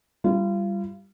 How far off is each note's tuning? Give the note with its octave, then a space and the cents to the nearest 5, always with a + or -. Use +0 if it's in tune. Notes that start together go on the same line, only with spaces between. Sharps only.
G3 +0 F4 -30